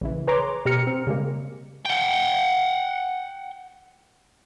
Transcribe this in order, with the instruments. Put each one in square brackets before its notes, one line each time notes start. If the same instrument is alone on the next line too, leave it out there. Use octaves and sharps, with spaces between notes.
[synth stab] A#1 C#3 E3
G#4 B4 C#5 A#5 C6 D6
B2 G4 A#5 F6 C#7
C4
C#3 G3 G#3 A#3
[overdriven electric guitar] F#5 G5